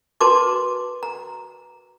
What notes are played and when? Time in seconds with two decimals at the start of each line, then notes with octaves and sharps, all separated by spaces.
0.21 F#4 B4 A5 C6 D6
1.03 A#5